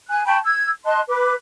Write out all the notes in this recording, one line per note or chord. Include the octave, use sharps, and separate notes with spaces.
G#5 F#6
G5 A5 B5 C#6
E6 G#6
D#5 A5 C6 F#6
B4 D6